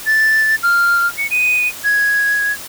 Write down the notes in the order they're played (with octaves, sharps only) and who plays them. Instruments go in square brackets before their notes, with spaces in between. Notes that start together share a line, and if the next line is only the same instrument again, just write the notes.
[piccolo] A6
F6
C#7
D#7
G#6